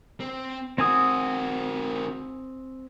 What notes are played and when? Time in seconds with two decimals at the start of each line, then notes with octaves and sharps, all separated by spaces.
0.20 C4
0.78 D#3 C4 F#4 G#5 D#6